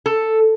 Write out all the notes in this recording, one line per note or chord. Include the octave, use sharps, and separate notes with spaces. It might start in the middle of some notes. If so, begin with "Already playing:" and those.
A4